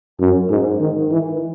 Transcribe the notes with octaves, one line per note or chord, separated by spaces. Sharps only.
F#2
G#2
D#3
E3